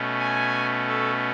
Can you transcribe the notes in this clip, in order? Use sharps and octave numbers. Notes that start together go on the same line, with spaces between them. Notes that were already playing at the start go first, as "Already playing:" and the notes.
Already playing: B2 A3 C#4
G#5
A4